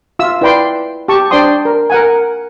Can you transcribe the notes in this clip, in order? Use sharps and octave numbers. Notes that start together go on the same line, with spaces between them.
F4 E5 E6
E4 B4 D5 G5 B5 C6
G4 A5 C#6
D4 C5 D5 G5 C6 D#6
A#4
A#4 F#5 G#5